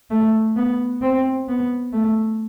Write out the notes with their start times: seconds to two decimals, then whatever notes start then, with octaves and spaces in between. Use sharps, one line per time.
0.11 A3
0.56 B3
1.02 C4
1.48 B3
1.93 A3